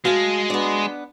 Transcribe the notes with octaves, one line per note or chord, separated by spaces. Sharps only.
G#3 F#4 F5 G#5 A5
B3 D4